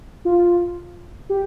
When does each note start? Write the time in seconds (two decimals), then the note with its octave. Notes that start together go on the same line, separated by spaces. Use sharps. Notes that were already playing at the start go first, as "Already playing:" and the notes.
0.25 F4
1.30 G4